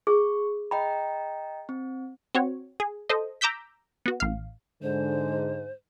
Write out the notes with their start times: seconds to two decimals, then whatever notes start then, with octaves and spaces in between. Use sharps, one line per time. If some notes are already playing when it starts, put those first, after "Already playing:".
0.07 G#4 C#6
0.71 D#5 G5 A#5 B5
1.69 C4
2.35 C4 F#4 C#5
2.80 G#4
3.09 A4 C5 D#5
3.41 A#5 D6 E6 G6 B6
4.06 B3 F#4
4.20 A1 F5
4.83 G#2 D3 G#3 C5